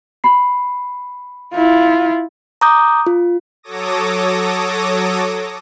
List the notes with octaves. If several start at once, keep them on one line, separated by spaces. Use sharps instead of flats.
B5 C7
E4 F4
A#5 D6 D#6 G6
F4
F#3 A4 C#5 D6 D#6 A#6